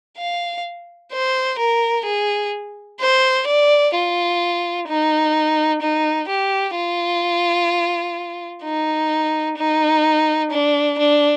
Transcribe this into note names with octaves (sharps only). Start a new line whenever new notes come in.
F5
C5
A#4
G#4
C5
D5
F4
D#4
D#4
G4
F4
D#4
D#4
D4
D4